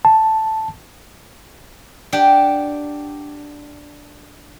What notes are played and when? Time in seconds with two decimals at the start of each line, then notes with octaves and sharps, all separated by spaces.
0.05 A5
2.12 D4 G4 F#5 G5